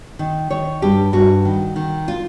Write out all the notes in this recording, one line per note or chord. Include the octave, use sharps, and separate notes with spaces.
D#3
D#3 C#5
G2 G4
G2 F#4
D#3
D#3
F4